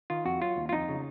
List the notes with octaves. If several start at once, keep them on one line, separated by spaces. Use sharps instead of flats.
D#3 F4
F2 F#4
F#3 F4
D#2
F4
F2 D#4
C#3